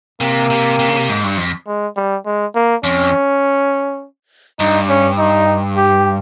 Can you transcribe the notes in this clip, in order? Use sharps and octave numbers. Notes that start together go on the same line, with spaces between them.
C3 A#3
C3
C3
C#3
C3
G#2
G2
F2
G#3
G3
G#3
A#3
F2 C#4
G2 D#4
C#4
D#4
G4